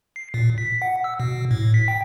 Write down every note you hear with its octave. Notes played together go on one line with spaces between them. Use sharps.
C7
A#2
B6
F#5
E6
B2
A2
B6
G5